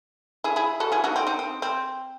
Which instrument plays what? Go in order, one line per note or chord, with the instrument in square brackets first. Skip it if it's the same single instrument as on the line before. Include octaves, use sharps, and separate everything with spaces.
[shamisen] E4 G#4
E4 G#4
F#4 A4
E4 G#4
D#4 F#4
C4
C4 D#4
C4
C4